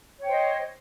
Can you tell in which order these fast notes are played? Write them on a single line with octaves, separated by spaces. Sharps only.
C#5 G5 C5 D#5